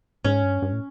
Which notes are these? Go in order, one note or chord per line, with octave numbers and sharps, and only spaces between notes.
G#2 C#4
G2
G2
A2